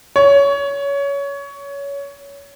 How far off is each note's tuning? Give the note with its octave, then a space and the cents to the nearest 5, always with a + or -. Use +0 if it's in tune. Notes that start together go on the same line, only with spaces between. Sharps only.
C#5 +20